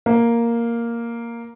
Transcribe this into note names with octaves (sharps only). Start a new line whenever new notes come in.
A#3